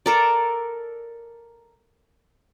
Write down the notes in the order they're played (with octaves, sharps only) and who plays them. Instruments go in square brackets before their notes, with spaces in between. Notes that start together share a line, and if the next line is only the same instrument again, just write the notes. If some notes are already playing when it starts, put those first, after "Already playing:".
[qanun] A4 A#4 D5